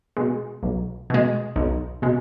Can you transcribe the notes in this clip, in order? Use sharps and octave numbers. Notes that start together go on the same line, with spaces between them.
B2 G#3
B1
B2 G#3
B1
B2 G#3